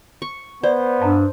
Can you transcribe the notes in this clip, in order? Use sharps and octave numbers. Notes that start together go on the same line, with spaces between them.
C#6
B3 C5 D5
G2 E5 A5 A#5